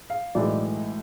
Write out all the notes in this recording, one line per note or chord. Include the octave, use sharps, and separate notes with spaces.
F5
B1 A2 E3 G#3 D5